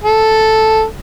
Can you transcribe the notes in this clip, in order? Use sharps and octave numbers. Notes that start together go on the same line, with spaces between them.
A4